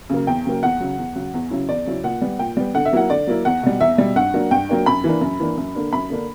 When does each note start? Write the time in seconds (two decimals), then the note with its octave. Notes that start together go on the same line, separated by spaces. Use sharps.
0.10 C#3 F#3 A#3
0.27 E2 G5
0.45 C#3 F#3 A#3
0.63 E2 F#5
0.80 C#3 F#3
0.98 E2
1.16 C#3 F#3
1.34 E2
1.51 C#3 F#3 C#4 E4
1.69 E2 D5
1.86 C#3 F#3 C#4 E4
2.04 A#2 F#5
2.22 G3 B3
2.39 A#2 G5
2.57 G3 B3
2.75 D3 F#5
2.85 E5
2.93 F#3 A#3 E4 F#5
3.10 D3 D5
3.27 F#3 A#3 E4
3.45 E2 F#5
3.63 B2 G3
3.81 E2 E5
3.98 B2 G3
4.16 G2 F#5
4.34 F#3 A#3 D4
4.51 G2 G5
4.69 F#3 A#3 D4
4.86 F#2 B5
5.04 E3 A#3 D4
5.21 F#2
5.40 E3 A#3 D4
5.57 F#2
5.75 D3 A#3 D4
5.93 F#2 B5
6.10 D3 A#3 D4